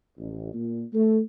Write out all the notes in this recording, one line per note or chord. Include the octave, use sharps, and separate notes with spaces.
A1
A#2
A3